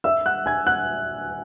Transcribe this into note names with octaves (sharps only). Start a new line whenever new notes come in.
E5 E6
F#5 F#6
G#5 G#6
F#5 F#6